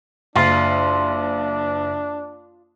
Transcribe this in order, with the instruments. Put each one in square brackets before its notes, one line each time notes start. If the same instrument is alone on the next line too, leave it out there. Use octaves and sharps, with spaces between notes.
[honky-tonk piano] F#1 [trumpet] D4 [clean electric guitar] F4